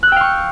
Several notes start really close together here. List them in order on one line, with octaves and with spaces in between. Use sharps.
F#6 E6 G5 F5 C#6